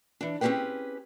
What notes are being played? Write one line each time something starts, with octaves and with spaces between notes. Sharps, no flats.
E3 D4
C4 C#4 D#4 G4 G#4 B4